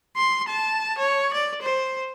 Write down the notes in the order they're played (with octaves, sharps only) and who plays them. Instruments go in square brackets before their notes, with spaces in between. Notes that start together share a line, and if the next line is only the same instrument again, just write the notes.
[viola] C6
A5
C#5
D5
C5